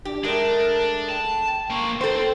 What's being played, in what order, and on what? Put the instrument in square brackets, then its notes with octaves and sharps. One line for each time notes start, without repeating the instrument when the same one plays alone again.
[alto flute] D4 [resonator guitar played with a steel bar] G4
[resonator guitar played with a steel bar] G#3 A3 [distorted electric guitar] D4 [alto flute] A#4
[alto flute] G5 [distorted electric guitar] A5
[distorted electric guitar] A#3 C5 [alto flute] C#6
[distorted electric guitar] C4 [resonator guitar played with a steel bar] A4 C5 [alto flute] G5